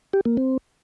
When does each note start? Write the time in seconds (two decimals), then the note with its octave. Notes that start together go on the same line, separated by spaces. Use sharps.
0.13 G4
0.25 A#3
0.37 C4